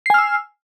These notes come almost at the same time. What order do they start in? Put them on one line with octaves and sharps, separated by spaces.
C7 G#5 F6 E6